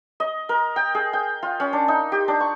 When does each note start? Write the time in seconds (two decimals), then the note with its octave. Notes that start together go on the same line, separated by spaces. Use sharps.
0.20 D#5
0.49 A#4
0.76 G5
0.95 G#4
1.13 G5
1.43 F4
1.60 C#4
1.73 D4
1.88 D#4
2.12 G4
2.28 D4
2.40 C#6